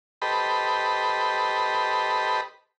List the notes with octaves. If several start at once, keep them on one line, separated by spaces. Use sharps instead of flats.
G4 A4 B4 C5 D#5 B5